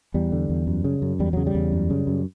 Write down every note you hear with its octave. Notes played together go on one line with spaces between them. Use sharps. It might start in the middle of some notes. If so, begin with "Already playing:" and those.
E2 G3
D3
E2
F#2
C#3
F#2
E2 G3
C#3 F#3
G3
E2
F#2
C#3
F#2